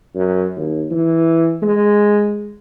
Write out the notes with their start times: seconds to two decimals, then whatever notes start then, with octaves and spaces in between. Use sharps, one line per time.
0.15 F#2
0.56 D#2
0.91 E3
1.62 G#3